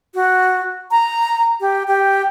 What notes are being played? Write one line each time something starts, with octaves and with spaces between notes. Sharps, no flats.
F#4
A#5
G4
G4